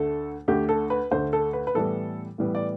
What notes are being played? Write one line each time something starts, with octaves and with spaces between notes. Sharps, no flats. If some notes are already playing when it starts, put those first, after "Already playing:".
Already playing: D2 D3 A3 A4
D2 D3 A3 G4
A4
B4
D2 D3 A3 C5
A4
B4
B4
A2 E3 G3 B3 A4
A2 E3 G3 B3
D5